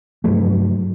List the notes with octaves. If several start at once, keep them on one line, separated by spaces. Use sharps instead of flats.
G2 F3 F#3 A3